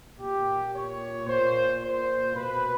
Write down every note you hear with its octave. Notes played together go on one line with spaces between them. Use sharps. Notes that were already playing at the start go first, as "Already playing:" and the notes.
A#2 G4
C#5
A#2 C5
C5
B2 B4